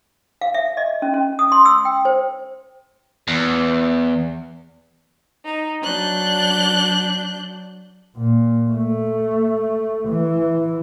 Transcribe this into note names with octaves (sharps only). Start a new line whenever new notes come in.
F5
E5
D#5
C#4
C#4
D#6
C6
E6
G5
C5
E2
D#4
F#3 D4 F#6 G6
A#2
A3
E3